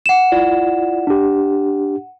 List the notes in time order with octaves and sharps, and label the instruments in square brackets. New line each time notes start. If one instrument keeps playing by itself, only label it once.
[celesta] F#5 E7
[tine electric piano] E4 F4 D5
D4 G4